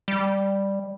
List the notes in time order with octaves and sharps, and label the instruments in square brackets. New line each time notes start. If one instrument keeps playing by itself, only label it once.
[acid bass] G3